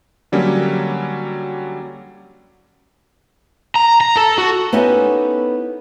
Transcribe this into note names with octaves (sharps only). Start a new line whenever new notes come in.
D3 F#3 G3 A#3 C#4
A#5
A#5
A4
F#4
B3 C#4 D#4 E4 G4 A4